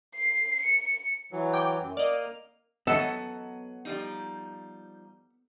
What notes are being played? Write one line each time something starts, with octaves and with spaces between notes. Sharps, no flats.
C7
C#7
E3 F#3
G5 D6
F#2
A#3 D5 D#5 F6
F#3 B3 A4 D#5 F#5
F3 G3 D#4